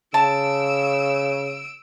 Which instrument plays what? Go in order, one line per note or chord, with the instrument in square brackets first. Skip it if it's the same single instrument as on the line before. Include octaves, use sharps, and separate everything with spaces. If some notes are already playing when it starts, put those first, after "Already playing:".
[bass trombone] C#3 [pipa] A5 [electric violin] E6 D7